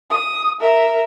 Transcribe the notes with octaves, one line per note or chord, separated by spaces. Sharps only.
D#6
A#4 E5